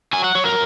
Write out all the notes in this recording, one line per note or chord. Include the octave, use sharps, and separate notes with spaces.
F#3 G#5
F#5
F#3 C#5
A#4